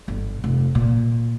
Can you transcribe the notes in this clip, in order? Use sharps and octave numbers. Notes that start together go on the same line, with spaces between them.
G1
F1
A#2